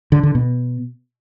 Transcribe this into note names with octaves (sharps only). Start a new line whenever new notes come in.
D3
D3
B2